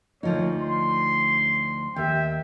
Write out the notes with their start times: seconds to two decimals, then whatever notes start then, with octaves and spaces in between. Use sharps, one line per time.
0.23 D2 F3 A#3 D#4 C#5
0.62 C6
1.96 D#2 E5 G5